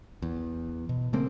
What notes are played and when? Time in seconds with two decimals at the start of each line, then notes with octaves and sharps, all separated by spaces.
0.22 E2
0.89 B2
1.13 C#3 A3 A#3 C4